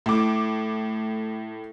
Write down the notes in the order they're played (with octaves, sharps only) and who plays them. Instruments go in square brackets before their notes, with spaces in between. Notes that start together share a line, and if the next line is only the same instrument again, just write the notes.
[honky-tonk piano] A2 D6